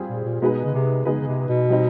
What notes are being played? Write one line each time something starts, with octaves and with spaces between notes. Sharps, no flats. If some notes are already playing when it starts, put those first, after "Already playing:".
Already playing: G3 C4 F4 G#4
A#2
A#2
B2 G#3 B3 D#4 G#4 B4
C#3
C3
C#3 G#3 B3 D#4 G#4 B4
C#3
C3
B2
G3 C4 D#4